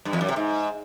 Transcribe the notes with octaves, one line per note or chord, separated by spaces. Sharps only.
G2
E2
F#2
C3
G#2